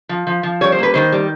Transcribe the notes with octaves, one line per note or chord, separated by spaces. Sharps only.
F3
F3
F3
G3 C#5
C5
A#3 B4
D#3 C5
G3